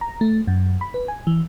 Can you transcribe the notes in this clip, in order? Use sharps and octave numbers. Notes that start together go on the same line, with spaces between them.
A#5
A3
F#2
B5
B4
G#5
E3